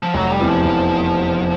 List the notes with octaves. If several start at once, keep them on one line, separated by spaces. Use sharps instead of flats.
F3
F1 F#3
G3
E2 C3 E3
F3
F1